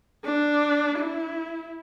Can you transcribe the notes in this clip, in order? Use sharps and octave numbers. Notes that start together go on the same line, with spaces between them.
D4
E4